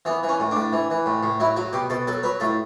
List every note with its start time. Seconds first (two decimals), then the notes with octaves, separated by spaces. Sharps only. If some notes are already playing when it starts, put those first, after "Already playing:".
0.05 E3 B3
0.23 E3
0.29 C#4
0.40 A2
0.51 A2 D4
0.73 E3
0.90 E3
1.06 A2
1.23 A2
1.40 F#3 E4
1.56 F#3 F#4
1.73 B2 G4
1.90 B2 A4
2.07 F#3 A4
2.23 F#3 B4
2.40 A2 A4